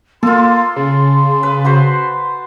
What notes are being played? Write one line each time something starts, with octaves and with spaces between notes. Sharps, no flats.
A#3 F4 A4 C6
C#3
B4
F#4 B4 C5